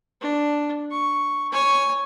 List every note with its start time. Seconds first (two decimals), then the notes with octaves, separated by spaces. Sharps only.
0.21 D4
0.91 C#6
1.52 C#5 G#5